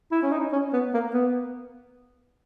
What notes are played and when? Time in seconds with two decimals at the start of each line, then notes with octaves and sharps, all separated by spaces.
0.12 E4
0.22 C#4
0.32 D#4
0.52 C#4
0.73 B3
0.94 A#3
1.14 B3